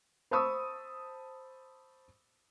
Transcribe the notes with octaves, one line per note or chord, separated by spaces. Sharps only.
C5 A5 B5 C#6 D#6 E6